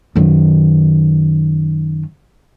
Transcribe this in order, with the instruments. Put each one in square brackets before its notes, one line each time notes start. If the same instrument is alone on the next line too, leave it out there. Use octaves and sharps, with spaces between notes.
[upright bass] F#2 D#3